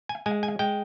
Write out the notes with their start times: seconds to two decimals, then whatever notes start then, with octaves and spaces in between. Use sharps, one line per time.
0.09 G#5
0.26 G#3 G#5
0.43 G#5
0.59 G#3 G5